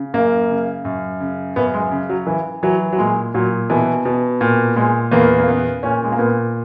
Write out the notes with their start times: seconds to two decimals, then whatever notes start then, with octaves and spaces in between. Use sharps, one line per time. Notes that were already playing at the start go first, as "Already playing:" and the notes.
Already playing: C#3
0.13 F#2 A#3
0.49 C#3
0.85 F#2
1.20 C#3
1.56 F#2 B3
1.74 G#3
1.91 C#3
2.09 F#3
2.27 E3
2.63 E3 F#3
2.93 F#3
2.98 A#2 G#3
3.34 A#2 F#3
3.70 B2 E3
4.05 B2
4.41 A#2
4.76 A#2 G#3
5.12 E2 A#3
5.39 A#3
5.47 C#3 B3
5.83 A#2 C#4
6.04 G#3
6.12 A#3
6.18 A#2 B3